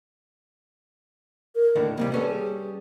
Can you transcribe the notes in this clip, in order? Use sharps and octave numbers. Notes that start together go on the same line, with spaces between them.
A#4
D#2 A2 D3
D#2 C3 G3 A#3
G3 C#4 A4 B4
G#4